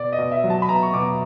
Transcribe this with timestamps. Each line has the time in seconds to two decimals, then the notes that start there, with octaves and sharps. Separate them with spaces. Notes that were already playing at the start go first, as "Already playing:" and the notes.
Already playing: B2 D5
0.13 D#5
0.18 B2
0.31 E5
0.44 F#3
0.50 A5
0.62 B5
0.69 B2 A#5
0.83 C#6
0.94 B2 D6